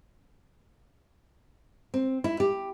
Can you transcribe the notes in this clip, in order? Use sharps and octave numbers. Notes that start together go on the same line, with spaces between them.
C4
E4
G4